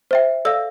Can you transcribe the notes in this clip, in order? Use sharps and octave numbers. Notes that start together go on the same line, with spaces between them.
C5 E5 G5
A4 D5 F5 E6